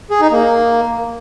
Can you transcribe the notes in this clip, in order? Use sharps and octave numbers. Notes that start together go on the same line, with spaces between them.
G#4
D#4
A#3